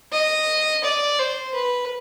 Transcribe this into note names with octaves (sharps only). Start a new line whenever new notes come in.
D#5
D5
C5
B4